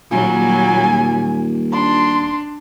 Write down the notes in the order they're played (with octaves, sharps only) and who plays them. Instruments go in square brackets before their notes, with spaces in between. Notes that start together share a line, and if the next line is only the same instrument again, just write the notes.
[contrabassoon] D#1 [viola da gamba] A#2 F#3 G3 [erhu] G#5
[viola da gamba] D4 [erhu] C6